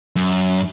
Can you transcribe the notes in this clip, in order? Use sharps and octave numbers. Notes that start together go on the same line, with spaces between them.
F#2